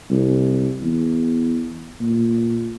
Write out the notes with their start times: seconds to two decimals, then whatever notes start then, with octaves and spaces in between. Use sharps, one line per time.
0.10 C2
0.83 E2
2.01 A#2